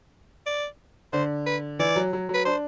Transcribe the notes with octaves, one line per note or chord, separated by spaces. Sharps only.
D5
D3 C5
B4
E3 D5
F#3
F#3
F#3
B4
D4 C5